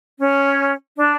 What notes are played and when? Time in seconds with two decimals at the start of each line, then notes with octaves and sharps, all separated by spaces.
0.20 C#4
0.97 D4